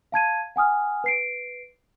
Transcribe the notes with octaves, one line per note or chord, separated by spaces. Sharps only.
F5 A5 G#6 D#7
F#5 G#5 D#6 F6
B4 C7 D7